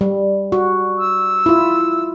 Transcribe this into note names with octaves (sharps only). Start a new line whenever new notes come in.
G3
F#4
E6
E4 F4